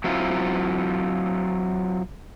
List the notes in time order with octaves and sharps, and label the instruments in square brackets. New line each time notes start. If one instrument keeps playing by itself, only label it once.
[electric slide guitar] F#3 C4 E4 F4